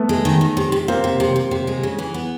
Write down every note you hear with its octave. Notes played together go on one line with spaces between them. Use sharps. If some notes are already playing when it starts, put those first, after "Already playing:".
Already playing: A3 B3
G#3
D#3
D#3
C3
C3
C3 A#3 C4
C3
C3
C3
C3
G#3
C#3
E3
B3